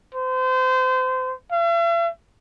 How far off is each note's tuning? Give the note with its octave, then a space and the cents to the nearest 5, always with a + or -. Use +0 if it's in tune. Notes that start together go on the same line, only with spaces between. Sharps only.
C5 -30
E5 +45